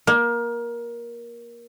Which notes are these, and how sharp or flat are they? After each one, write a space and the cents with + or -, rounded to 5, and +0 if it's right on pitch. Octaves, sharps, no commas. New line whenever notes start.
A#3 +20